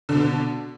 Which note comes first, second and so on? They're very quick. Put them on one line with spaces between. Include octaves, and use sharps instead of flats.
D3 D4 B2